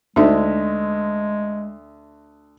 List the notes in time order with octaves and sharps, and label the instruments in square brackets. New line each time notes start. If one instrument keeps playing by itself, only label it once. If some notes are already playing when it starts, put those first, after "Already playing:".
[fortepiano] D2 [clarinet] G#3 [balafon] D4 D#4 E5